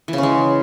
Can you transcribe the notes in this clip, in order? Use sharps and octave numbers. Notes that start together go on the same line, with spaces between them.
E3
C#3
C#4
G#3